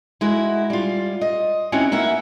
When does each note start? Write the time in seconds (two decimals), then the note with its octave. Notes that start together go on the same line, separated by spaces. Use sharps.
0.21 G#3 E4 F#4
0.70 G3 F4
1.21 D#5
1.72 C4 C#4 D#4 E4 F#4
1.92 A#3 E5 F#5